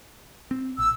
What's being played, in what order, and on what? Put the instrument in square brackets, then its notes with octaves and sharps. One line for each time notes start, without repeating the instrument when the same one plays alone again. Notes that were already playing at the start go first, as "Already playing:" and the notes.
[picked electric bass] C4
[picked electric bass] A#1 [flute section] E6